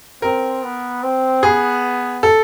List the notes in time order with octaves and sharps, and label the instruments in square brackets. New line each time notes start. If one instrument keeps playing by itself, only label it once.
[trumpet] C4 [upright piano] A#4
[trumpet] B3
C4
[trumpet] B3 [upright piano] G#4
[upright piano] A4